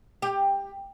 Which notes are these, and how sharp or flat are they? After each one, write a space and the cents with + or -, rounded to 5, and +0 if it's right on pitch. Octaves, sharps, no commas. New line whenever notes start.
G4 +15